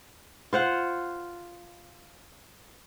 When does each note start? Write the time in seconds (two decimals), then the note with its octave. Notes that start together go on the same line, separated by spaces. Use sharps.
0.53 F4 C5 F#5